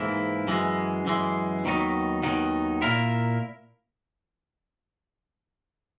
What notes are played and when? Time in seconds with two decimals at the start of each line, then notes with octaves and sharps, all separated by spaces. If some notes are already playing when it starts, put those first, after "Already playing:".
Already playing: G#2 E3 A#3 E4
0.47 F#2 E3 G#3
1.05 F#2 E3 G#3
1.65 D#2 D#3 F#3 B3 D#4
2.22 D#2 D#3 F#3 B3 D#4
2.82 A#2 A#3 E4 A#4